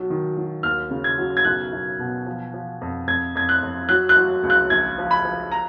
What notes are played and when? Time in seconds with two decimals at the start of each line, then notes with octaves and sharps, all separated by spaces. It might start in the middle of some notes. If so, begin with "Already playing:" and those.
Already playing: B1 F#3
0.10 D#3
0.37 F#3
0.63 D#2 F6
0.91 C#3
1.04 G#6
1.18 F#3
1.37 G#6
1.45 B1 F#6
1.72 B1
1.99 B2
2.26 F3
2.54 F3
2.81 F2
3.07 F2 G#6
3.35 F2 G#6
3.49 F#6
3.62 F2
3.89 F#3 F#6
4.09 F#6
4.16 F#3
4.43 C#2
4.50 F#6
4.70 A#1 G#6
4.98 F3
5.11 B5
5.25 F3
5.52 A#5